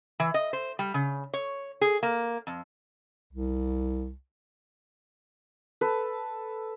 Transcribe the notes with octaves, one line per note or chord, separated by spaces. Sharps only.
E3
D#5
C5
G3
C#3
C#5
G#4
A#3
F2
C2
A4 B4